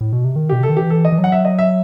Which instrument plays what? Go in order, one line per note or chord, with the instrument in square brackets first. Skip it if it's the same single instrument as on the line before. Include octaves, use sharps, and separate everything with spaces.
[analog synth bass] A2
B2
C3
D#3
[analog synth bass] B2 [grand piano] G4
[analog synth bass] C3 [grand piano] A4
[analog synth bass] D#3
[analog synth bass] E3 [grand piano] G4
[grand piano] A4
D#5
[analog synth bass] E3
F#3
[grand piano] F#5
E5
D#5
E5